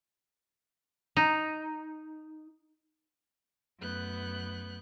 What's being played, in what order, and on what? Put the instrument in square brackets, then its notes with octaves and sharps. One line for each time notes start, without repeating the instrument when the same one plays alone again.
[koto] D#4
[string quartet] F#2 A3 B3 F#6 G6